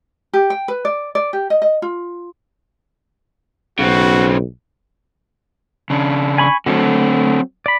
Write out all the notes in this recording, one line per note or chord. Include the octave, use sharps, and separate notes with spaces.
G4
G5
B4
D5
D5
G4
D#5
D#5
F4
B1 C#3 C4 F#4
C#3 D4
G#5 B5 C#6
D3 F#3 A3 C4 F#4
D5 B5